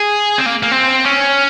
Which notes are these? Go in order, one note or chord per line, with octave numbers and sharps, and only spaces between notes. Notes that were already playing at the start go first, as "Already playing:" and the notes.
Already playing: G#4
C4
A#3
A#3
C4
C#4